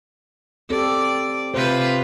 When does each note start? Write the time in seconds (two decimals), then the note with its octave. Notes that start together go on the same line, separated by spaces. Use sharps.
0.70 C4 G4 A4 D5
1.54 C3 F4 B4 C5